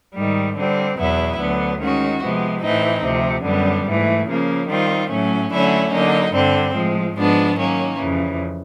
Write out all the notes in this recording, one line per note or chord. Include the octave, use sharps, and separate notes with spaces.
G#2 D#3 G3
D3 G3 C4
E2 B2 F#3 B3 E4
D2 D3 F#3 B3
D#3 G#3 C#4 F#4
C3 F3 G#3 B3
A2 E3 A3 C4 D#4
D2 C3 F3
F#2 D3 G3 B3
G#2 E3 A3
C#3 F3 A#3
D#3 G3 C4 F4
A2 F#3 A3 C#4
D3 F#3 A3 C#4 E4
D3 F#3 A#3 D#4
G2 D3 G3 C4
A2 F3 G#3
G#2 F3 G#3 B3 D4
D#3 F#3 A#3 C#4
F2 C#3 E3